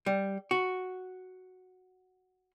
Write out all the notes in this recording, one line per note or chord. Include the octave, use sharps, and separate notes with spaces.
G3
F#4